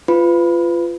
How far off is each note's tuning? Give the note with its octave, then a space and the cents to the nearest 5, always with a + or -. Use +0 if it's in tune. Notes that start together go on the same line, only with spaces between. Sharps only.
F4 -20 B4 +25 B5 +0